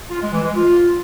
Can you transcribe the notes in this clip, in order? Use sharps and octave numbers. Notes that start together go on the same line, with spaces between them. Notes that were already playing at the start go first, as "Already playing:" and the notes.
F4
G#3
E3
G#3
F4